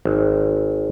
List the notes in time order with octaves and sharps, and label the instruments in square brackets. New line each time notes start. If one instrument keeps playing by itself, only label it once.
[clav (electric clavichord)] G#1